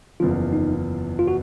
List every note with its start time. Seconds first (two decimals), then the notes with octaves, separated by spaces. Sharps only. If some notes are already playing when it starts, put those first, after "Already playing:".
0.20 F#1 E2 C#3 F3 F4
0.53 D#4
1.19 F4
1.28 F#4